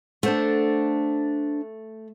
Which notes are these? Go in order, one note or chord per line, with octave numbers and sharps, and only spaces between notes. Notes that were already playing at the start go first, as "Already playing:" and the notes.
A3 D4 C5 F#5